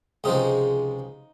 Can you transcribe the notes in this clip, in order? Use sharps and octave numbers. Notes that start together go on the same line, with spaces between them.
C#2 C3 F3 G#3 D#4